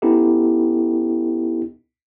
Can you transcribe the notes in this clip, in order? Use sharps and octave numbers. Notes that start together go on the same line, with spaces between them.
B3 C#4 D#4 E4 G4 A4